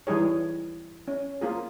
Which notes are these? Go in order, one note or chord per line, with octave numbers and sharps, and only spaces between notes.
E3 G3 D#4 G#4 C#5
C#4
A#3 F4 G#4